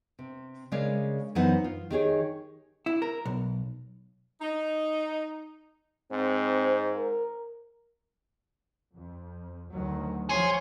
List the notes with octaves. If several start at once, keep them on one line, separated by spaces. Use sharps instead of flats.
C3
C#3 G#3 A#4 C#5 D5 F5
F#2 E3 B3 D#4 C5 F#5
F4
D#3 G4 G#4 C#5
E4
A#4
B1
D#4
G#2 C4 C5
A#4
F2
D2 D#3 F#3
F3 F#3 G#4 C#5 C6 C#6